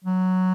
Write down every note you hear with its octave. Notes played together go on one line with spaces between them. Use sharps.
F#3